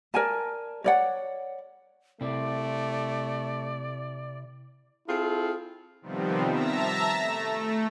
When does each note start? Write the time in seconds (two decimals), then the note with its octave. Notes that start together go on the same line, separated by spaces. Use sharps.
0.14 A#4 D5 G#5 A5
0.84 C#5 D5 F#5
2.21 C3 A3 E4 D5
5.08 C4 E4 F4 G#4 A4
6.02 C3 D#3 F3 G3 B3 C4
6.51 E5 A5 A#5 E6 A#6
7.20 A3